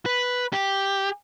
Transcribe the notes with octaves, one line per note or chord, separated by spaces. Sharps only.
B4
G4